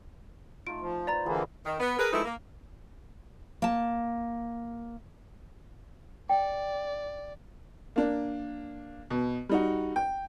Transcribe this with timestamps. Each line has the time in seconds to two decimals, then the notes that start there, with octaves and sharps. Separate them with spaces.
0.67 A3 D#4 F4 D7
0.81 F3
1.07 B4 C5 D5 A#5 A6
1.26 D3 E3 F3 G3 A#3 G#4
1.66 D#3
1.80 B3
1.99 G#4 A#4 B4
2.13 F3 G#3 A3 B3 D#4 E4
2.25 A#3
3.62 A#3 A5
6.29 D5 G5
7.96 A#3 D4
9.10 B2
9.49 G3 D#4 F#4
9.96 G5